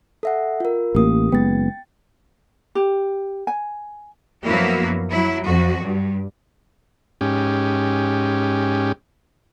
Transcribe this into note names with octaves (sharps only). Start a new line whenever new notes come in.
A4 E5 F#5
F4 A#4
A1 A#3 G4 D#6
F#1 G#3 B3 G5 A6
G4
G#5
F#2 F3 A#3 B3 E4 F#4
F#3 E4
F2 F#4
G2
G#2 C#4 G4